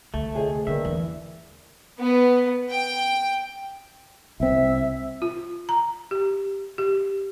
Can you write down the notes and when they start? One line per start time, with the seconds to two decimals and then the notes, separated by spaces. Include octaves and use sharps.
0.14 D2 A3
0.34 C3 G#4 D#5
0.67 G2 D3 A#3 E5
0.85 E2
1.99 B3
2.70 G5
4.40 C2 C4 E5
5.22 F4
5.69 A#5
6.11 G4
6.78 G4